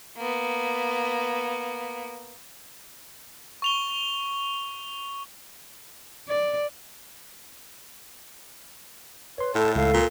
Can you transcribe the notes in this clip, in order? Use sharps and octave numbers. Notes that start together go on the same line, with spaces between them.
A#3 B3
C#6 F7 G7
D5
B4 C#5 C6
A2 A4 A5
C#2 A4 F5
A#2